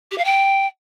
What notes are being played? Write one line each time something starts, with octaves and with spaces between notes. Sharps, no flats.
G4
F5
G5